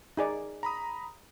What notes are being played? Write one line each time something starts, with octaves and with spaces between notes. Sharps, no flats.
D#4 G#4 D5
A#5 B5 D#6